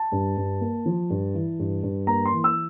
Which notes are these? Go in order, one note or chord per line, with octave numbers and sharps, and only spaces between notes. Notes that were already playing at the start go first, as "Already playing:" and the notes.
Already playing: A5
G2
G2
A#3
F3
G2
E3
G2
G2
A#3 A#5
C6
E3
E6